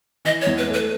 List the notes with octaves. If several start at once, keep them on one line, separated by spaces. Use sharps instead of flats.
E3 D#5
C#5
E2
B4
A3
B4